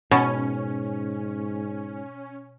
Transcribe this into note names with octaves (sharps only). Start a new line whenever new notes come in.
G#2 B2 C#4